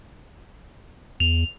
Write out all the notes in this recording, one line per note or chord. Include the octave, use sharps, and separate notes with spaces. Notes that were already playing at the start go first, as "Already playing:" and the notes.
E2 F7